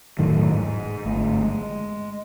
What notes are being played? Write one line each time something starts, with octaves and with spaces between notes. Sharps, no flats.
E1 A2 D#3 F#3
G#2
G1 A3
G#3